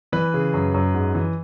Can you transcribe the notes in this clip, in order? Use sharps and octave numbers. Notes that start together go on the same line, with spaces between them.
E3 B4
C#3
F#2
F#2
G#2
E3